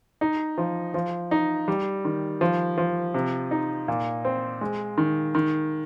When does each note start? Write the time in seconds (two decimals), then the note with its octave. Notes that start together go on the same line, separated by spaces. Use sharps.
0.21 D#4
0.58 F3
0.94 F3
1.31 D#4
1.68 G3
2.05 D#3
2.41 F3
2.78 F3
3.14 C3
3.51 D#4
3.88 A#2
4.25 C4
4.61 G#3
4.98 D#3
5.35 D#3